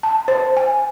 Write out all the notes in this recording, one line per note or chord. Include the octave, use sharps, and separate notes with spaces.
A5
C5
G#5